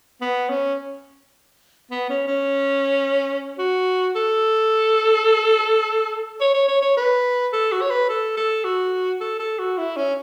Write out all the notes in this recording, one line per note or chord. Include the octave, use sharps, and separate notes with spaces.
B3
C#4
B3
C#4
C#4
F#4
A4
C#5
C#5
C#5
C#5
B4
A4
F#4
C#5
B4
A4
A4
F#4
A4
A4
F#4
E4
C#4